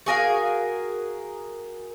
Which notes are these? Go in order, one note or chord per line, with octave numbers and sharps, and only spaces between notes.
F#4 G#4 A#4 F5